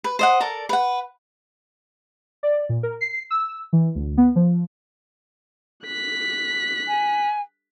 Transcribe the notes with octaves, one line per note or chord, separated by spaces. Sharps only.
B4
C5 D#5 F#5
A4 A#4 D5
B4 F#5
D5
A#2
A#4
C7
E6
E3
D2
B3
F3
F#6 B6
G#5